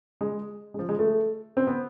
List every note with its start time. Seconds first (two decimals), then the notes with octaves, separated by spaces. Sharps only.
0.21 G#3
0.74 G#3
0.79 F3
0.89 G#3
0.99 A3
1.57 C4
1.67 B3